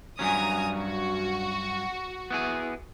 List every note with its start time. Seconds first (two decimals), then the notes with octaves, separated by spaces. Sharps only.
0.19 G2 F#3 C#4 G#5 A#5 D#6
0.74 F#4
2.31 B3 E4 G#4